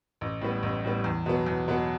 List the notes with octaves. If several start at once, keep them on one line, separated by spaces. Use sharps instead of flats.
A1
A2 G3 B3
A1
A2 G3 B3
E2
B2 F#3 B3
E2
B2 F#3 B3